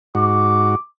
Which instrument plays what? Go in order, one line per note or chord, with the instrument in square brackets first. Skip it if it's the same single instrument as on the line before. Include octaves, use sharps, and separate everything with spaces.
[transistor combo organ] G#2 F#4 [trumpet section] D6